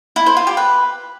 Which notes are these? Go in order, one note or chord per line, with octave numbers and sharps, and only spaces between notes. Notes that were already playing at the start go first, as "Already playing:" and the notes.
E4
C5
F4
G4
B4